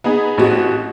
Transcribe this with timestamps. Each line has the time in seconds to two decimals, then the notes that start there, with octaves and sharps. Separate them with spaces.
0.04 B3 D#4 G#4
0.38 A1 C4 F#4 G4 D#5